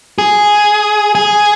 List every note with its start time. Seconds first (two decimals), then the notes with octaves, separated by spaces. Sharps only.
0.18 G#4
1.15 G#4